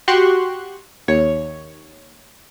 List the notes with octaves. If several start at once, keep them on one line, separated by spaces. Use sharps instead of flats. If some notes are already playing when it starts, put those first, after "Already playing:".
F#4 G4 C6 C#6 F#6
D#2 C#5